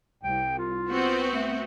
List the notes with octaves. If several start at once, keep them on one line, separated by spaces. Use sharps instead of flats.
C2 G5
F4
B3 C4 F#4
A3